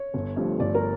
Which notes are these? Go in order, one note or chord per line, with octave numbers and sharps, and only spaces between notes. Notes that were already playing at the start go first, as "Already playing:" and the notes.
Already playing: C#5
G1
G2 F3 A3
G1 D5
A#4